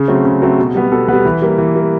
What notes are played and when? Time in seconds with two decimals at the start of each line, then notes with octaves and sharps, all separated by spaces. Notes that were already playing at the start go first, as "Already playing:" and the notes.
Already playing: C#3 G#4
0.08 F#3 A3 C4
0.25 C#3
0.42 F#3 A3 C4
0.58 B2
0.75 G3 B3
0.92 B2 A4
1.08 G3 B3 B4
1.25 E3
1.42 G3 A#3
1.58 E3
1.75 G3 A#3